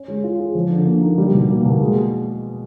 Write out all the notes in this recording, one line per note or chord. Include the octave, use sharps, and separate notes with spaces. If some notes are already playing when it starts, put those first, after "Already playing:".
Already playing: C#4
G#3
F4
G#4
F3
D3
A#3
D#4
G3
B2
A#3
B2
G#3